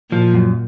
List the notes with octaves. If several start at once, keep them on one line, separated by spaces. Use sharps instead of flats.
A#2 F3
F#2